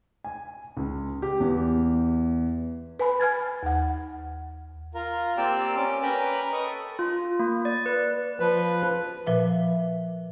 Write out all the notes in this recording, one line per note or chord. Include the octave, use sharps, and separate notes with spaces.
G#5
C#2
G4
E2
B4 G#5 B5
G#5 F6 G#6 A6
D#2 F#5
F4 A#4
A#3 C4 G4 D5 G5 E6
C#4 D6
C#4 A#4 B4 G5 A#5 B5
B4 D#5 C#6 D#6
A4
F4
A#3
D5
B4
F3 B4
A#2 F3 B4 E5